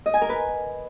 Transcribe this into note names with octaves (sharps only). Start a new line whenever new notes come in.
D#5
G#5
A#4
B4